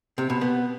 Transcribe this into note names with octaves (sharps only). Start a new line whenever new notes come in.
C3
B2
B3